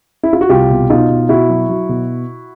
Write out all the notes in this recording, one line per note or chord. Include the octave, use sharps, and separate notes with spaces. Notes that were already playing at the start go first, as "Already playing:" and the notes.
E4
F4
F#4
C2 F4 G4
B2
B2 D#4 F4
B2
B2 E4 F#4
F#3
F#3
B2